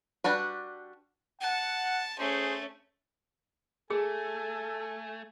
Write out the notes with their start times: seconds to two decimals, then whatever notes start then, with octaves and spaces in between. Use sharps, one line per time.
0.24 G3 D4 F#4 B4
1.41 F#5 A5
2.19 A3 C#4 G#4 C5
3.90 A3 G#4 A4 G#5